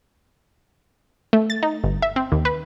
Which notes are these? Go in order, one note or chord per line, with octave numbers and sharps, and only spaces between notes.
A3
A6
D#4
G1
E5
C4
D#2
B4